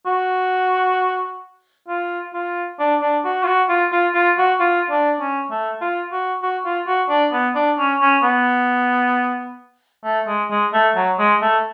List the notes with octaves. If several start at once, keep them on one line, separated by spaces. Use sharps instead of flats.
F#4
F4
F4
D4
D4
F#4
F4
F#4
F4
F4
F4
F#4
F4
D4
C#4
A3
F4
F#4
F#4
F4
F#4
D4
B3
D4
C#4
C#4
B3
A3
G#3
G#3
A3
F#3
G#3
A3